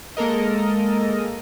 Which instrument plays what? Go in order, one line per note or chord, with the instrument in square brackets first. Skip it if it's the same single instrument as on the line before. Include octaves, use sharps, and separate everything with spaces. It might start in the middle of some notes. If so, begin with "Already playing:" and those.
[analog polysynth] G#3 A#3 A4 A#4 D#5